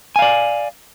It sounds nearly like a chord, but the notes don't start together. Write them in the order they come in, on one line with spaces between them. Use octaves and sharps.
G#5 F5 D5